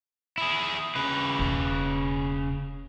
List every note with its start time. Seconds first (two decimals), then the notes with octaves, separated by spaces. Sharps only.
0.38 E4 G#4
0.96 C#3 B4
1.39 E1 A#3